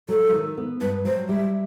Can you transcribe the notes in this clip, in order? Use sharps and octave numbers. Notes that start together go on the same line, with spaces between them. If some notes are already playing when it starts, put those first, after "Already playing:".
F#3 A4
D#3
B3
G2 B4
F#3 C5
G3 E5